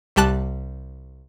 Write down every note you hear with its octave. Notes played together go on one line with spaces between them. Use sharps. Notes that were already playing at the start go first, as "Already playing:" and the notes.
C2 G3 G4 A5 F#6